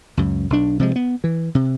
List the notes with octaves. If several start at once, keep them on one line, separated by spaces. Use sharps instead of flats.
C#2 F#2
B1 D4
C3 F3 G#3
B3
E3
C3